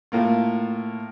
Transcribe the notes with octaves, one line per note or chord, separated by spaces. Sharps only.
A2 A#3 F4